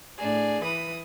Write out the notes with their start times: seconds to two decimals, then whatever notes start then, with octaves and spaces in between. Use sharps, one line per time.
0.19 A2 D4 G#4
0.63 E3 B4 D#6